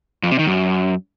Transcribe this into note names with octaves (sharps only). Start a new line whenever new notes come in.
F2
C3
D#3
F#2